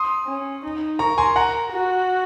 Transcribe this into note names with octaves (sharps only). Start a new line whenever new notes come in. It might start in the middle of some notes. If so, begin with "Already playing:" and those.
Already playing: C6 D#6
C#4
D#4
A#4 A#5 C#6
G#5 C6
F#5 A#5
F#4